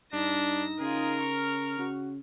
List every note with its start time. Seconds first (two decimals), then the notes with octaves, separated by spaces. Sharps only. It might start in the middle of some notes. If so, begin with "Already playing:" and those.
0.13 G2 D4 D#4 E6 A#6
0.80 C#3 F4 G#4 A#4
1.20 C#6 F6
1.78 C#3 F#4